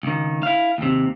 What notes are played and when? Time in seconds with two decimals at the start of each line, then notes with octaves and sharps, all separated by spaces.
0.03 C#2 D#3
0.43 E4 F5
0.78 D#2 C3